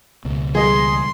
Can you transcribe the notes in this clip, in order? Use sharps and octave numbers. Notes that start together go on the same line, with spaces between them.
C#2 B2
E3 G3 G#4 D#5 C6